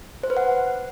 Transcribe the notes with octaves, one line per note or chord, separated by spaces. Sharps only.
C5
B4
F#5